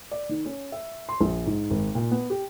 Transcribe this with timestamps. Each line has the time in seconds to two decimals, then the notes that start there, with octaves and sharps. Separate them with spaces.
0.11 D5
0.29 D#3
0.45 C#4
0.72 E5
1.09 C6
1.21 A#1
1.46 G#2
1.70 G#1
1.95 A#2
2.11 B3
2.30 G4